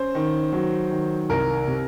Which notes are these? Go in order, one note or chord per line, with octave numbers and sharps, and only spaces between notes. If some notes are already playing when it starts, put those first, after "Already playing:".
Already playing: C#4 C5
D#3
F#3
D#3
C2 A#4
C3